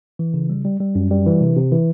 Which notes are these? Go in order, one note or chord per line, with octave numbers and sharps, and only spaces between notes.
E3
C#3
G3
G3
G3
F#2
G3
E3
C3
C3
E3